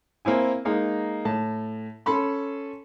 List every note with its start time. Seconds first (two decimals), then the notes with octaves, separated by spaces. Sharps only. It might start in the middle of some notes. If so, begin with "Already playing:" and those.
0.25 A#3 C4 E4 G#5
0.65 G#3 A#3 D#4
1.25 A2 A5
2.06 C#4 A4 A5 B5 C6